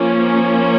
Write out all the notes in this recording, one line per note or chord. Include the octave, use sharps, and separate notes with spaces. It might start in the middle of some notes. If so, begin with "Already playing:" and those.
Already playing: F3 A#3 C#4